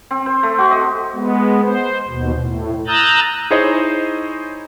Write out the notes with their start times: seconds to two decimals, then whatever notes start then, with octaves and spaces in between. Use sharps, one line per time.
0.11 C4
0.26 C5
0.43 A3
0.58 F#4
0.71 D#5
1.14 G#3 B3
1.64 C5
2.08 D#2 B2
2.41 A2
2.87 A#5 D#6 E6 F#6 G6 A6
3.51 D#4 E4 G#4 C5 C#5 D#5